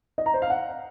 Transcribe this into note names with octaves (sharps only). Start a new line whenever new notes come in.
D#5
A#5
C5
F5
F#5